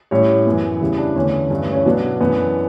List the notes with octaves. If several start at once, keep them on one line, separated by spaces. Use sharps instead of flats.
A2 G3 C#4 C#5
F#2 E3 B3
E2 C#3 G3 E4
D4
E2 D3 A3 C#4
G2 E3 A3 C#4
C#4
B2 F#3 B3 D4
F#2 E3 B3